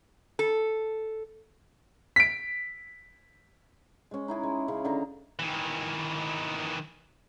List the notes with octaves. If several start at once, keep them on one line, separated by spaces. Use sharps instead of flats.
A4
B6 D7
G#3 C#4
D#4 E4 G#4
G#3
C#3
D3 D#4 A#5
D#3 E3